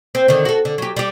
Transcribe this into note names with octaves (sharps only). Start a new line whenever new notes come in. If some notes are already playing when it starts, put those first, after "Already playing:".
C4
D3 D#3
F#4 A4
D3
F#3 G4
G3 G4